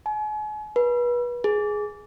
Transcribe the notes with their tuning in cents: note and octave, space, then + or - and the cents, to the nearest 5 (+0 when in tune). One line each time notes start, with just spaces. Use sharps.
G#5 +40
B4 -30
G#4 +5